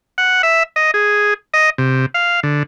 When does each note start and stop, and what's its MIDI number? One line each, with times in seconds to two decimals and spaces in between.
0.18 0.42 78
0.43 0.63 76
0.76 0.91 75
0.94 1.34 68
1.54 1.70 75
1.78 2.06 48
2.14 2.40 77
2.43 2.63 50